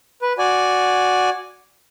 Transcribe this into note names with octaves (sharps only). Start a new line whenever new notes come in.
B4
F#4 D5 G#5